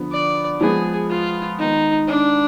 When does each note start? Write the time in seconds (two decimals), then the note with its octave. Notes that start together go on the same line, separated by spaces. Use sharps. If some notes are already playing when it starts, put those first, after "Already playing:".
Already playing: D3 F3 B3
0.12 D5
0.60 F3 G#3 B3 G#4
1.10 F4
1.59 D#3 G#3 B3 D#4
2.08 D4